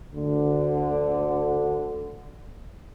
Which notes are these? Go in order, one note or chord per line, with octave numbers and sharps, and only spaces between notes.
D2 D3